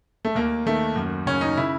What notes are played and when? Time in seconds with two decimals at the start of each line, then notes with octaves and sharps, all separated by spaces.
0.25 A3
0.35 D#2 A#3
0.66 D#3 A3
0.96 F#2
1.26 C#3 C#4
1.41 D#4
1.57 C#3 E4